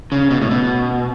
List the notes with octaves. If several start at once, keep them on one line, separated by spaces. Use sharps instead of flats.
C#3
B2
A2
B2